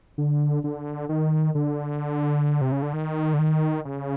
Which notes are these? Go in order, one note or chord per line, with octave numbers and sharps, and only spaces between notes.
D3
D3
D#3
D3
C3
C#3
D3
D#3
D3
D#3
C#3